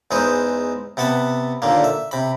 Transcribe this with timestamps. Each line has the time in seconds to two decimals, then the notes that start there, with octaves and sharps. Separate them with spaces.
0.11 E2 G#3 D#4 B4 C5
0.97 C3 B3 F#5 A5 B5
1.62 D#2 A#2 D3 A#3
1.84 E5
2.11 C3 B5